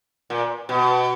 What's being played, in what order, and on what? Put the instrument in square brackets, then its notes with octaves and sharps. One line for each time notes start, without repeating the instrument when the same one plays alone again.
[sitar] A#2
B2